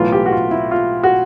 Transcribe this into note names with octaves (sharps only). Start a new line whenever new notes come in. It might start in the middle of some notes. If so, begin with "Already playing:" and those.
Already playing: B1 A2 E3 F4
G4
F#4
F4
E4
F4
F#4